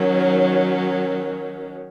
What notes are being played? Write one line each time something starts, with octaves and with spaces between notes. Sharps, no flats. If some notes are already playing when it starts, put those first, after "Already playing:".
Already playing: D#3 F#3 C#4
A#4
A#4